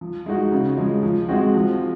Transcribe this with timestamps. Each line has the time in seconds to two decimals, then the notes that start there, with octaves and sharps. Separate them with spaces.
0.01 F3
0.26 G#3 D#4 F#4
0.52 C#3
0.77 F3 G#3
1.03 F3
1.29 G#3 C4 F#4
1.54 F3